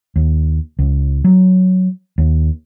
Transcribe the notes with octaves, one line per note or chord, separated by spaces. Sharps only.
D#2
C#2
F#3
D#2